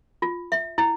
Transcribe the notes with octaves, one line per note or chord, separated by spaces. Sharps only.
F4
E5
E4